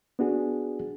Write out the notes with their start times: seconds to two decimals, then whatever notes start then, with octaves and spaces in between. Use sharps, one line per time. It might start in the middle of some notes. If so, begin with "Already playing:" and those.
0.19 B3 D4 F#4 G#4